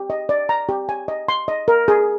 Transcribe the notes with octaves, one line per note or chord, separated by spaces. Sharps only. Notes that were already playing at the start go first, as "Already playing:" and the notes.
Already playing: G4
D#5
D5
A#5
G4
G#5
D#5
C6
D#5
A#4
G#4